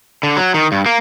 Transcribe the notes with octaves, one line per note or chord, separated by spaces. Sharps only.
D3
F#3
D#3
G2
A#3